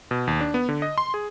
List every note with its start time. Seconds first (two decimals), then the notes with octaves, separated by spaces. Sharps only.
0.11 B2
0.27 D#2
0.41 D4
0.54 B3
0.69 D3
0.82 D#5
0.98 C6
1.14 G#4